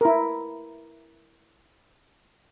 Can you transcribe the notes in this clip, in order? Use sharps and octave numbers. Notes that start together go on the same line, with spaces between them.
E4 A#4